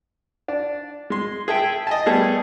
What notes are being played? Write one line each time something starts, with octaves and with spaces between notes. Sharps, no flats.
D4
G#3 C6
G#4 A4 E5 G5
D#5 G#5 A5
G3 A3 B3 G#4 A4